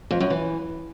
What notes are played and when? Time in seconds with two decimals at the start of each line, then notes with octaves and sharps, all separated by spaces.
0.11 F2
0.20 F#2
0.30 E3